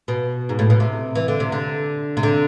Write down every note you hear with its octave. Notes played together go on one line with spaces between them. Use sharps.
B2
G#2
A2
B2
C3
E3
D3
C3
D3
C3
D3